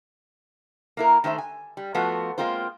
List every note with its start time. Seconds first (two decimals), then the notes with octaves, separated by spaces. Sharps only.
0.97 A#3 E4 A#4
1.24 D#3 A3 C5 E5
1.38 G#5
1.77 G3
1.94 F3 A3 B3 F4 F#4
2.38 G#3 A#3 C4 F4 C5